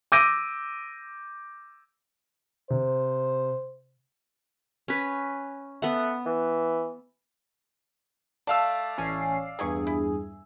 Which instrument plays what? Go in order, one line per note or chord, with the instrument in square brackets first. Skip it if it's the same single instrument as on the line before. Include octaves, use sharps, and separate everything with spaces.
[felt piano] D6 E6 G6 A#6 D7 D#7
[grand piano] C3 [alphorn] C5
[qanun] C#4 B4
[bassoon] A3 [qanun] B3 F#5
[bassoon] E3
[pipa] A3 A5 [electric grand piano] D5 F5 E6
[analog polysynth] A1 C#4 C7
[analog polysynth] E2 G2 G#4 [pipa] C3 G#5 C#6
[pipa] E4